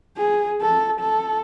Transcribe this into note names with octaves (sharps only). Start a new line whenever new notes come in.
G#4
A4
A4